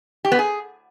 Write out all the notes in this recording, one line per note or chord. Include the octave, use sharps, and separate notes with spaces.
G4
B3
G#4